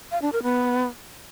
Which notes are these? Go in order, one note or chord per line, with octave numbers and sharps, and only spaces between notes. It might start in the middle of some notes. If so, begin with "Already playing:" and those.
F5
D4
A#4
B3